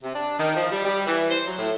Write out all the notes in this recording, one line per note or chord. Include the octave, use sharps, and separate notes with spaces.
C3
D4
D#3
F3
G3
G3
E3
C5
F#3
A2